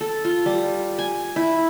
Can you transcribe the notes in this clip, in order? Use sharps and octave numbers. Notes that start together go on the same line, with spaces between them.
A4
F4
G3
G#5
E4